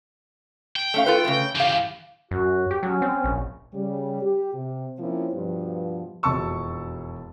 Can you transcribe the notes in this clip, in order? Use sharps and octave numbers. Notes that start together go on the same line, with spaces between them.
G5
A3 C#4 F5
F4 A4 B4
C#3 F3 A3
C#3 E3 G4 F5
F#2 F#4
G4
F#3 C#4
C4
A#1
C#3 G3
G4
C3
F3 A#3 C4 C#4 E4
G2 B2 F3
E1 F2 A5 C#6 E6